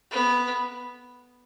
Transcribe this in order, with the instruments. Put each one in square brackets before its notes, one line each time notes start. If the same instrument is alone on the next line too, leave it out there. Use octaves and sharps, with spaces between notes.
[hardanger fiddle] B3